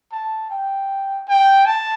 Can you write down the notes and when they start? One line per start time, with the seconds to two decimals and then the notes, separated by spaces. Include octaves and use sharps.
0.12 A5
0.50 G5
1.28 G5
1.66 A5